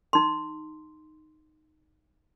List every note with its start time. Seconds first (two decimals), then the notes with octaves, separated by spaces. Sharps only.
0.13 D#4 C6